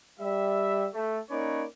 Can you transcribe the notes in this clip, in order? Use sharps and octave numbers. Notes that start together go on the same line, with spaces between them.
G3 E5
A3
A#3 C#4 D#4 B4 C#5 D5